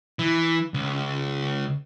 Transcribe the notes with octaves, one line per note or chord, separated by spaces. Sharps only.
E3
C#2